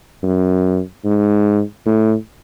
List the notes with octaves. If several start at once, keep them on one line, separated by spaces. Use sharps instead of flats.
F#2
G#2
A2